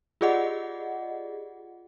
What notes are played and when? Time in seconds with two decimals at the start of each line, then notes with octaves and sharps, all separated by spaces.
0.21 F4 G4 G#4 D5 D#5 F#5